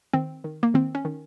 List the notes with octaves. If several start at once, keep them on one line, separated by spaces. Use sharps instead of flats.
D#3 C4
D#3
A#3
D#3 C4
C#4
D#3